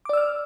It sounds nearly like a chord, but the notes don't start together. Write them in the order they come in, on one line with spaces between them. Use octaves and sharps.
D6 D5 E6 F6